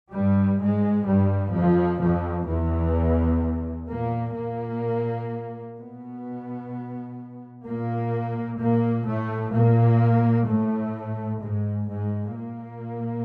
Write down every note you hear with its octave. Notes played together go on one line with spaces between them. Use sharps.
G2 G3
G#2 G#3
G2 G3
F2 F3
F2 F3
E2 E3
A#2 A#3
A#2 A#3
B2 B3
A#2 A#3
A#2 A#3
A2 A3
A#2 A#3
A2 A3
G#2 G#3
G#2 G#3
A#2 A#3